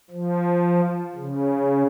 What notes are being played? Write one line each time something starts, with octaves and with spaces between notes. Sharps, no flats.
F3
C#3